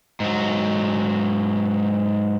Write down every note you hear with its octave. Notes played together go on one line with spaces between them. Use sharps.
G#2 F#3